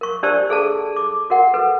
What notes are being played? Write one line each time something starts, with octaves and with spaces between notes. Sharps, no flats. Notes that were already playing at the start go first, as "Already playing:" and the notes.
A#4 C#6
D4 G4 C5 D5 A5 E6
G#4 A4 A5
D6
F#4 A#4 F#5
A4 B4